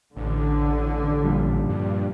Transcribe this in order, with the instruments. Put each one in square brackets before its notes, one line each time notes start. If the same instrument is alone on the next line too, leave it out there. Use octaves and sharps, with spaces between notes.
[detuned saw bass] A1 [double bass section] D3
[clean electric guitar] A#2 F3 G3
[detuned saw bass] G2